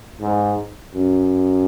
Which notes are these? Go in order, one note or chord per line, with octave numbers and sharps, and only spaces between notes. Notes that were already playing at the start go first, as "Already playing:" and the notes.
G#2
F#2